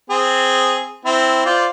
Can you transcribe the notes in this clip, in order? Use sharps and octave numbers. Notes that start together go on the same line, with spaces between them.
C4 G#4
C4 E4
F4 C5 D5